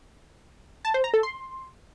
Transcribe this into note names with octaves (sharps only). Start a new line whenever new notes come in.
A5
C5
A#5
A4
C6